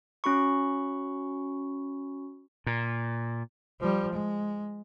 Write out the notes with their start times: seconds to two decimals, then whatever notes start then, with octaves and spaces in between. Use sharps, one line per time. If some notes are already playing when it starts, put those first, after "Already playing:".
0.24 C#4 F#4 B5 C#6
2.67 A#2
3.80 F3 G3
4.13 G#3